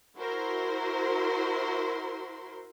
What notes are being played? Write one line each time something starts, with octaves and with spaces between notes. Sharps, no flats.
E4 F#4 A#4 C5 C6